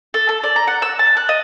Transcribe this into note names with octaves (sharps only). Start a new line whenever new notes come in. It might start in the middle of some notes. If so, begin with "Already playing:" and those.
A4
A4
D5
A#5
F#5
E6
A5
F#6
D#5